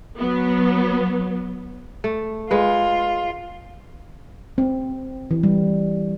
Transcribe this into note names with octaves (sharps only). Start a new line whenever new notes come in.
F#3 B3
A3
G#3 F4 B4
C4
E3
G3